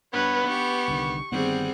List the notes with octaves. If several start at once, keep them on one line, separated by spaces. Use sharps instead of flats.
G2 B3 B4 C#5
G4 C#6
C2 D3 D#3
G1 D#3 G3 B3 C4 G#4 F#5